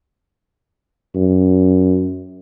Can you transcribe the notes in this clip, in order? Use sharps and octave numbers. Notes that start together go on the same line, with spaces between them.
F#2